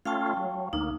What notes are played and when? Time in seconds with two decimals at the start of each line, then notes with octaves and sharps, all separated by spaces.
0.05 A3 C#4 F4 F5 G5 A5
0.37 F#3
0.73 D2 A#3 D#4